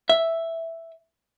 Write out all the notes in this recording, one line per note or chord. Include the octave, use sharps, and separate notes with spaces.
E5